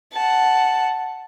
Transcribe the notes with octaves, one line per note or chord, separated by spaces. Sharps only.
F#5 A5